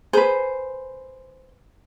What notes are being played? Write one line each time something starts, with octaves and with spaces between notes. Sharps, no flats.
G#4 B4 C5